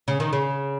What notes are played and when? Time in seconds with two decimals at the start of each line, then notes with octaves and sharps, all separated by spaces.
0.08 C#3
0.20 D#3
0.33 C#3